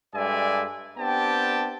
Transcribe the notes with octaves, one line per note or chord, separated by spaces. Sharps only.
G2 G#3 A4 D5 E5 G#5
B3 C4 D4 G4 G5 A5